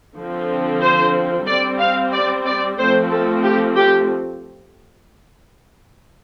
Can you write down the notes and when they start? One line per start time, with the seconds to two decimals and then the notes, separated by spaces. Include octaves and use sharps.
0.16 D3 F3 C4
0.81 C5
1.46 G3 C4 D5
1.79 F5
2.12 D5
2.45 D5
2.78 F3 A3 C4 C5
3.11 A4
3.44 G4
3.77 G4